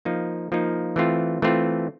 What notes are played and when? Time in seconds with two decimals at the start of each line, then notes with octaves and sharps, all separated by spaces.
0.05 F3 A#3 D#4
0.52 F3 A#3 D#4
0.96 E3 A3 C4 F4
1.42 E3 A3 C4 F4